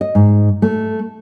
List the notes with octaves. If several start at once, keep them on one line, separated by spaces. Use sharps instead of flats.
D#5
G#2
A3